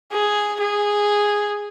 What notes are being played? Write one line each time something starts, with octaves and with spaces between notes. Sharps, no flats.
G#4
G#4